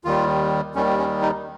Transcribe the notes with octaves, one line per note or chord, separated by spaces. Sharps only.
D#2 D#3 G3 F4
D#2 D#3 G3 C#4
C#4
D#4